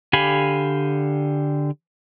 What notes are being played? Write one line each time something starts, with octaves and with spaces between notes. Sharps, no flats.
D3 G4 F5 G#5 B5